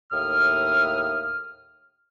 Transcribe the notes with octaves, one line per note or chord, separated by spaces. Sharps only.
D#2 A2 E5 D#6 F6